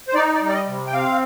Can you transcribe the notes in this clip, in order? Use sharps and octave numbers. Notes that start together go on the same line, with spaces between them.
C5
D#4 D5
D5
G3
D5
D#5
C3
G5
C4 F5